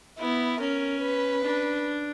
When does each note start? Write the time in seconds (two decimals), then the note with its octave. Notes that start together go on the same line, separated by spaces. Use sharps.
0.18 B3 E4
0.60 C#4 A#4
1.02 B4
1.44 D4